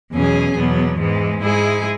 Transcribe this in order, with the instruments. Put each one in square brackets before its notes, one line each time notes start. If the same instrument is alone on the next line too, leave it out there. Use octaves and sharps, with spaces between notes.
[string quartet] E2 B2 F#3 C#4 G#4
E2 B2 F#3 B3
G#2 E3 G#3
G#2 G#3 E4 G#4